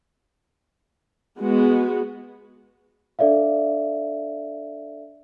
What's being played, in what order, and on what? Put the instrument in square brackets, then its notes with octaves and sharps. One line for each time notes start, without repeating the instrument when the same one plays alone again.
[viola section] G#3 B3 F#4
[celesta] D4 A4 D5 E5 F5